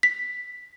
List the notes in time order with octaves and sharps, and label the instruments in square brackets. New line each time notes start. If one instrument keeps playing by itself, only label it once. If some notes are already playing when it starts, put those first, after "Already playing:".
[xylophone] B6